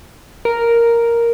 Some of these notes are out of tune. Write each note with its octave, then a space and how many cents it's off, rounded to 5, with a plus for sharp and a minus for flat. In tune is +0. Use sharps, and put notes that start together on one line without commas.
A#4 +0